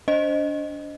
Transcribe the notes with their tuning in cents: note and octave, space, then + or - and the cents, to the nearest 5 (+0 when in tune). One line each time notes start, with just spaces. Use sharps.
D4 -30 C5 +0 D#5 -10